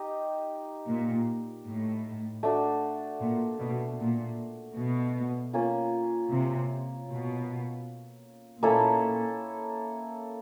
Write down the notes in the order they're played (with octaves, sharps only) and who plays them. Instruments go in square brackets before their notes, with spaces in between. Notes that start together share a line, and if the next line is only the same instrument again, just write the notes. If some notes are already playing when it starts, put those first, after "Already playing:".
Already playing: [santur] D#4 G4 D#5
[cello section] A#2
A2
[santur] A3 D4 F#4
[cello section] A#2
B2
A#2
B2
[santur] A#3 C#4 F4
[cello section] C3
B2
[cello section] A#2 [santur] A#3 C#4 E4 A4